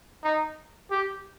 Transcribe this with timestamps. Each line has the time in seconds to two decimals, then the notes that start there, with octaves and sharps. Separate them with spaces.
0.24 D#4
0.91 G4